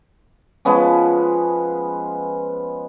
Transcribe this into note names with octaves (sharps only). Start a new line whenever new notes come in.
F3 G#3 B3 C#4